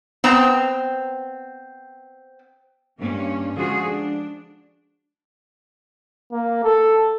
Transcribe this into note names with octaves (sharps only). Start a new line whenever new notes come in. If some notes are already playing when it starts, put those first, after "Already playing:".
B3 C4 A#5
G2 A#3 C#4
D3 F3 G#3 F4 F#4 G#4
D4
A#3
A4